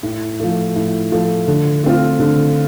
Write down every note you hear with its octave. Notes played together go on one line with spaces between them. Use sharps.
A2
F3 A3
A2
F3 A3
D3
A3 C4 F4
D3